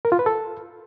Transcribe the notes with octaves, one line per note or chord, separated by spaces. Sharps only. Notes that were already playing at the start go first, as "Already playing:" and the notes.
A#4
F4
B4
A4